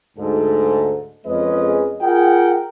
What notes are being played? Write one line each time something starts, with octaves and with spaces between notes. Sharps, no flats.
D2 G#2 A4
F2 G#3 C#4 G#4 B4 D#5
F4 G#4 A#4 F#5 G5